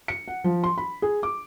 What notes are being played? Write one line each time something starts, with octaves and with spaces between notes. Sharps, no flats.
C#7
F#5
F3
C6
B5
G#4
D6